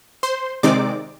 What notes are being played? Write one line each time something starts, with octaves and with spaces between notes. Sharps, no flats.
C5 C6
C3 D#3 G#3 C4 D#4 D5 D6